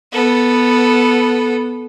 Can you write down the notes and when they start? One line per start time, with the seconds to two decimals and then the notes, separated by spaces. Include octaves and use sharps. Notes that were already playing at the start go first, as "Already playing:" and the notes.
0.12 B3 A4